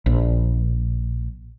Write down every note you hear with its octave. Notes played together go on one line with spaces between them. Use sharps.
A#1